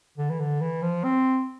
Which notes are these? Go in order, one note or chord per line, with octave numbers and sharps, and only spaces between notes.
D3
E3
D3
E3
F3
C4